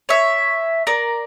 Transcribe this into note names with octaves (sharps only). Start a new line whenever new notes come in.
C#5 E5
A#4 D5